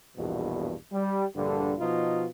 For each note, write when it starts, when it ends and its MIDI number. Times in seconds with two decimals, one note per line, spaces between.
0.17 0.74 34
0.17 0.74 40
0.17 0.74 43
0.17 0.74 47
0.92 1.25 55
1.35 1.74 34
1.35 1.74 43
1.35 1.74 50
1.79 2.26 47
1.79 2.26 53
1.79 2.26 63
1.79 2.26 65